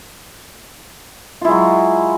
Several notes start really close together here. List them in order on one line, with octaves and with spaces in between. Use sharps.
F4 E4 G#3 F#3